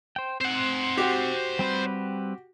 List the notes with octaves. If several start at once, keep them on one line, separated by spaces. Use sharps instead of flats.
C5 G5
C4 C5 F#5
F#4 G4
G3 C4 B4